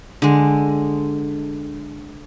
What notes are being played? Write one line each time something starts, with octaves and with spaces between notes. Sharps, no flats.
D3 G#3